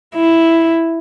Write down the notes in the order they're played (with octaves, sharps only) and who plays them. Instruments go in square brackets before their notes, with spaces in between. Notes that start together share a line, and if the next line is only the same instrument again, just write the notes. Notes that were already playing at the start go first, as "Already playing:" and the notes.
[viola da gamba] E4